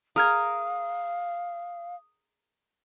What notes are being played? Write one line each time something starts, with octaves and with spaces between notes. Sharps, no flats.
G#4 A#4 F5 D#6 F6 G#6